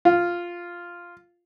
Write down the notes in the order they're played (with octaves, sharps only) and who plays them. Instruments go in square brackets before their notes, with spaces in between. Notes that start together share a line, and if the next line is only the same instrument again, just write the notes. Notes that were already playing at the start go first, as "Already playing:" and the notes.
[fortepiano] F4